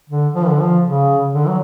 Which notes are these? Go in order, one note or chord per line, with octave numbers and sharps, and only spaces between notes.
D3
F3
D3
F3
C#3
D3
F#3